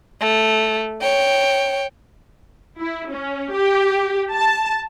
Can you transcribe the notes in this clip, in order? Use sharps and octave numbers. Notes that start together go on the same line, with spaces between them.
A3
C#5 G5
E4
C#4
G4
A5